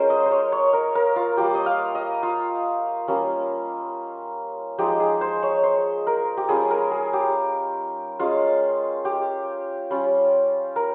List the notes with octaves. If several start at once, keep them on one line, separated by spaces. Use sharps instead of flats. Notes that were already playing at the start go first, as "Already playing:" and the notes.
Already playing: G#3 C#4 F4 A#4 C5
D#5
C5
C#5
C#5
A#4
A#4
F4
G3 A#3 F4 G4
D#5
F5
D#5
F4
G3 A#3 C#4
F3 G#3 D#4 G4
G#4
C5
C#5
C5
A#4
G4
G3 C#4 F4 G#4
A#4
G#4
G4
G#3 C#4 F4
G4
G3 C#4 F4
A#4